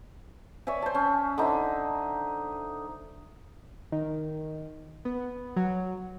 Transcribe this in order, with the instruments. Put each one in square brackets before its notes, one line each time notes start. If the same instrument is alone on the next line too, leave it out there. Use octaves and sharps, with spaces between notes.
[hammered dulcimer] C#5 D5 E5 G#5
C5 A5
C#4
D3 D#4 C5 E5
[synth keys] D#3
B3
F#3